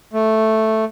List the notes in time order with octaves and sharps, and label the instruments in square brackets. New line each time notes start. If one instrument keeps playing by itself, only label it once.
[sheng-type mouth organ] A3